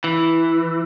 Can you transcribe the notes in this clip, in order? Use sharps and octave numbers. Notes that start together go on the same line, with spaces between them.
E3